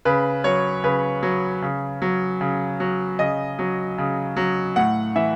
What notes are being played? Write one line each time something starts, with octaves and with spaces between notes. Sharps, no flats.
C#3 B4
F#3 C#5
C#3 B4
F#3
C#3
F#3
C#3
F#3
C#3 D#5
F#3
C#3
F#3
A2 F#5
E3 E5